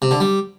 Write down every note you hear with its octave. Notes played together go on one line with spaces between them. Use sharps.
C3
D3
G3